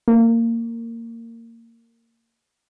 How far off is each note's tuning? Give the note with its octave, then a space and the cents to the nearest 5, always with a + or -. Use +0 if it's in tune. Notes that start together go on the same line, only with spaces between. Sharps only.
A#3 -20